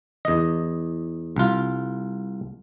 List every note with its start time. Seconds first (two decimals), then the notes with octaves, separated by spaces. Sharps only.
0.25 E2 D#5
1.36 C2 F4